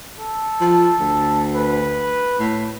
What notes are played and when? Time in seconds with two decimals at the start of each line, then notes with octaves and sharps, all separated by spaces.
0.19 A4
0.61 F3
0.99 D2
1.54 B4
2.39 A2